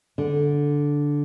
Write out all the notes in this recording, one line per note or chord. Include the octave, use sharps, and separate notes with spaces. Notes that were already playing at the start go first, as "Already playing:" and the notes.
D3